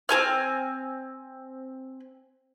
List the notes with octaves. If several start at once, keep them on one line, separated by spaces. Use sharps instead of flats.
C4 G#4 G#5 F6